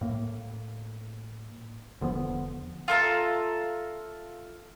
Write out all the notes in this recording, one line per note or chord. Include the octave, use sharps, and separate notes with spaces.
A2 A#3
E1 D3 F3 B3
F4 A4 E5 A#5